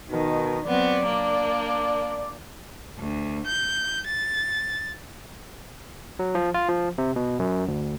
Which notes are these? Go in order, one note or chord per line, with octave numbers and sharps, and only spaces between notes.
B2 D#3 D#4 A#4
F#3 B3 C4 D5
A#3 D4
D2
G6
A6
F#3
F3
F4
F3
C3
B2
F#2
D2